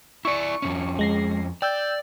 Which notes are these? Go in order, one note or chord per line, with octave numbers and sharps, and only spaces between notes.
E4 D5 C#6 C#7
F2 A#2 C#4
G#3 A#6 C7
D5 G5 E6 G6